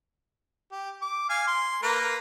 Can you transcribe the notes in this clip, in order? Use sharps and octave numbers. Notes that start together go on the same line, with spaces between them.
G4
D6
F5 G#5
C6
A#3 A#4 B4